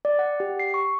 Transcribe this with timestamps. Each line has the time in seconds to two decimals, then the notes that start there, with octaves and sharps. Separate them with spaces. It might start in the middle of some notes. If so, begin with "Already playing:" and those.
0.05 D5
0.19 F#5
0.40 G4
0.59 C7
0.74 C#6